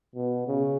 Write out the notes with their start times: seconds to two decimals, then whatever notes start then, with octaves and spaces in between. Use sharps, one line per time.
0.15 B2
0.47 C#3